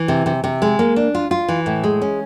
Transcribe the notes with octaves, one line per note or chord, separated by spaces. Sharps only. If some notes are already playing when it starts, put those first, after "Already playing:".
Already playing: E3
C3
C3
C3
G#3
A#3
D4
F4
F4
E3
A2
G#3
C#4